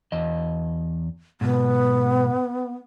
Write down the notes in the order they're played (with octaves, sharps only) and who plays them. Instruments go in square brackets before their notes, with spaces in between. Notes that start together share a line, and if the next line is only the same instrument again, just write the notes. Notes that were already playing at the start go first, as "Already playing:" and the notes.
[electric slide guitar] E2 D#5
[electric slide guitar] G#2 B2 [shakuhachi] B3